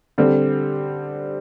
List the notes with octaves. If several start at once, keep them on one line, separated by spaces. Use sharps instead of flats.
D3 G3 C4